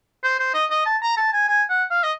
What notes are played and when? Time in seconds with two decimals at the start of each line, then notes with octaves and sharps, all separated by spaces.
0.23 C5
0.39 C5
0.54 D#5
0.70 D#5
0.86 A5
1.02 A#5
1.17 A5
1.33 G#5
1.48 G#5
1.69 F#5
1.90 F5
2.03 D#5